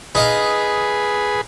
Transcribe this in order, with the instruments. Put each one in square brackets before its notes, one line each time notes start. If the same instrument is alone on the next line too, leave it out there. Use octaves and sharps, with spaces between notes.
[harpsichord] D#4 D#5 F5 [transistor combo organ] G#4 B4